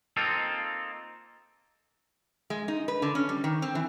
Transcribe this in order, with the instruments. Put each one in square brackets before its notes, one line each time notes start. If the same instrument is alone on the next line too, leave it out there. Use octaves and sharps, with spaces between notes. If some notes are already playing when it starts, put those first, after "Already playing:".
[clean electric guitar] A#3 C4 D#4 F4 A4
[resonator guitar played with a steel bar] G#3
D#4
B4
D3
C#4
G3
D#3
C4
E3